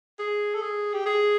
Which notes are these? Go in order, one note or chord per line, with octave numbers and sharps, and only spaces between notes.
G#4
A4
G#4
G4
G#4